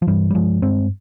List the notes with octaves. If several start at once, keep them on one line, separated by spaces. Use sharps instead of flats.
F3
G2 E3 G3
G3
G2 F3 G#3
G2 G#3 C4